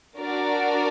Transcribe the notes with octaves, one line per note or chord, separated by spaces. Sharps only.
D4 F#4 A#4 D5